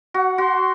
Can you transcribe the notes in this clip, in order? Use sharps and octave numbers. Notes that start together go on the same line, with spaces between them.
F#4 F#5
F#4 C6